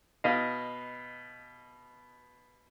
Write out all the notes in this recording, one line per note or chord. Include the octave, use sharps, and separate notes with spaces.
B2 D#5 F5